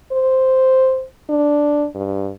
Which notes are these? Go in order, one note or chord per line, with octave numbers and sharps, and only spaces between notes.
C5
D4
G2